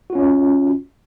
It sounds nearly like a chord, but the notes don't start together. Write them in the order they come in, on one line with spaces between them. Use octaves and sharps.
F#4 F4 C#4